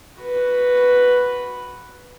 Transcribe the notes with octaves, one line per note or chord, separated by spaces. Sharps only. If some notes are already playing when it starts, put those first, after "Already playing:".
F#4 B4